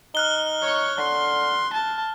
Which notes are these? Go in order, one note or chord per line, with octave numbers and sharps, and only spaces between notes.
D#4 F6 F#6 G7
C#5 C#6
D3 C6
A5